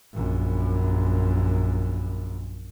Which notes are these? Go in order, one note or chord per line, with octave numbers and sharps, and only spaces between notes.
A#1 F#2